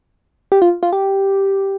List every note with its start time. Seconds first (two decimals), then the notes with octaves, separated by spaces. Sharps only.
0.52 G4
0.62 F4
0.83 F4
0.93 G4